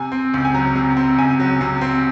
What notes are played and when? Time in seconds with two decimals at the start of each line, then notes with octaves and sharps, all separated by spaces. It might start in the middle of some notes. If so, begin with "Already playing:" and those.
Already playing: C3 G#5
0.12 C4
0.34 C#2
0.45 G#5
0.54 F#3 A#5
0.75 C3
0.97 C4
1.18 C#2 G#5
1.40 F#3
1.61 C3
1.81 C4